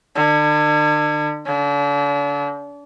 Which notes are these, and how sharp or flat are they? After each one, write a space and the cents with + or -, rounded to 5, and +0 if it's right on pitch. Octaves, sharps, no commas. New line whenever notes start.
D3 +35
D3 -40